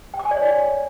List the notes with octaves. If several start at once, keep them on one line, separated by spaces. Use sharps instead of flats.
G5
D6
G#5
D5
C#5